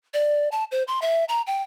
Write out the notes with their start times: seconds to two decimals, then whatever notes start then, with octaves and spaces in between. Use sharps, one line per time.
0.14 D5
0.52 A5
0.71 C5
0.88 C6
1.02 E5
1.29 A#5
1.47 G5